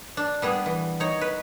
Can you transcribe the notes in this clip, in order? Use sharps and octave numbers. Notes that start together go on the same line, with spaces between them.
D4
G3 B3 G#4
E3
D#4 C#5
B4